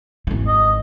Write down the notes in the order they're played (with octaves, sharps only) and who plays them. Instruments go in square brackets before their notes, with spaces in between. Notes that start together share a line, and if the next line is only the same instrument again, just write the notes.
[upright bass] G#1 E3
[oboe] D#5